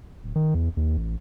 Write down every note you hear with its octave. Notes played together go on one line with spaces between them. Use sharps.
D1
D#3
E2
D#2
A1